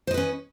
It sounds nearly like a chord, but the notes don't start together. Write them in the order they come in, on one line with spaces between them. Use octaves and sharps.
C5 D#5 B4 C#4